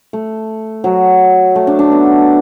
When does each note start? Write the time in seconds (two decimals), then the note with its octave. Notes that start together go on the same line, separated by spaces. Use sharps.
0.13 A3
0.84 F#3
1.56 A3
1.67 D4
1.79 D4
1.91 B3